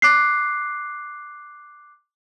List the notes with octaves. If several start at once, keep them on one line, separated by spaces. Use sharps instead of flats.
D6 F#6 C7